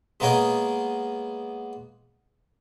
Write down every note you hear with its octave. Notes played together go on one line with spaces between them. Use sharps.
G#3 A#3 B3 A#4 C#5 D#5